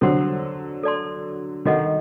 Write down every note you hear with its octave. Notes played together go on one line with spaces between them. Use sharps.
D3 F#3 A4 C5 F#5 C6
A4 D5 A5 C6
D#3 F#4 A4 D#5 F#5